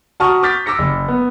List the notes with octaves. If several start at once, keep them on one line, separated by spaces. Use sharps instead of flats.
F#4 A5 A#5 C#6 D#6 F6
D6 F6 G6 A6 B6
D6 E6 A#6 C#7
F#1
B3